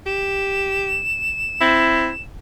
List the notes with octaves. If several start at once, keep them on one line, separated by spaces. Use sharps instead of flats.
G4 E7
C4 E4